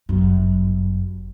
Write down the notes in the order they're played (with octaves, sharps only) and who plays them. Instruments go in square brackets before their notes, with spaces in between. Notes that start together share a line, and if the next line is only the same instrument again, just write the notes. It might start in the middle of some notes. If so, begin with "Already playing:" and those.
[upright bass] G1 F#2